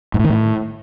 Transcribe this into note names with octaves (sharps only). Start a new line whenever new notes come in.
G#2
A2
D#3
A2